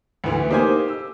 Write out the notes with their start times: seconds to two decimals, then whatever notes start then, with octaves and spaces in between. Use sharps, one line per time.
0.24 D2 E3
0.50 A#3 D#4 G4 C5 G#5
0.88 E6